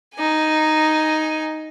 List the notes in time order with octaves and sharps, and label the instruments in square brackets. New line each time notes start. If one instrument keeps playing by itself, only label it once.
[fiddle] D#4 G#5